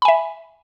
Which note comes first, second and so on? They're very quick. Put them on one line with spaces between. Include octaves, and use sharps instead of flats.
B5 G#5 E5